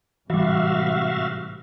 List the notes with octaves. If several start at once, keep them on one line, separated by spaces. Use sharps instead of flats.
A1 G#2 C3 E3 G3 F#4 E5 F5